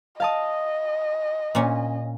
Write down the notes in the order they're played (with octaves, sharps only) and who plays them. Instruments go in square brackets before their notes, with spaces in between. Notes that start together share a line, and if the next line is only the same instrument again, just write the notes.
[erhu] D#5 [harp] F5 A5 D#6
[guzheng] A#2 C#4